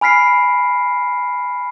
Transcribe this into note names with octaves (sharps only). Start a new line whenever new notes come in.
G#5 B5 F6 B6 C7 D7